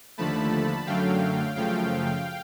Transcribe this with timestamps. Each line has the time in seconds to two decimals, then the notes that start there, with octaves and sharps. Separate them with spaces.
0.18 D#2 D3 F3 A3 A5 B5
0.87 F#2 D3 F#3 A3 F5 G5
1.55 F#2 C#3 F3 A3 F5 G5